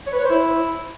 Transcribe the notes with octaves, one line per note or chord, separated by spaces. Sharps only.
C#5
B4
C#5
C5
E4